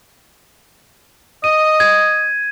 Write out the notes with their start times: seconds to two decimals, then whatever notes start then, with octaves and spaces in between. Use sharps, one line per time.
1.44 D#5 D#7
1.80 G#6